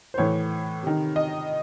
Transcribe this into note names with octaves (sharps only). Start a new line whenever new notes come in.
C5
A2 E3 C#5
C3 D#3
D#5